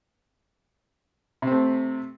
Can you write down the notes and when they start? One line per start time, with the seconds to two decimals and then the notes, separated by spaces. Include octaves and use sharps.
1.42 C3
1.47 C4
1.52 A3